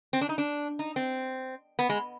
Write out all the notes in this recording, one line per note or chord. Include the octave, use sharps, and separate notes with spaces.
C4
D4
D#4
D4
D#4
C4
B3
G#3